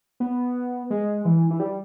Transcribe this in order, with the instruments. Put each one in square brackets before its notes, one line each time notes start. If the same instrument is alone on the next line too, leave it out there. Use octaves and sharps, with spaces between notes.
[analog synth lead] B3
G#3
E3
E3
G3